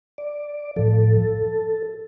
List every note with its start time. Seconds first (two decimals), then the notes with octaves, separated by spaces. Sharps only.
0.18 D5
0.76 A2 F3 A4